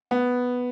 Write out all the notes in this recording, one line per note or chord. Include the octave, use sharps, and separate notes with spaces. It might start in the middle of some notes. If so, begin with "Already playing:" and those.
B3